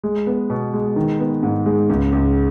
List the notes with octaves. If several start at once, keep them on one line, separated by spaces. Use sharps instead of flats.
G#3
B3
B2
G#3
D#3
B3
G#2
G#3
C#2
C#2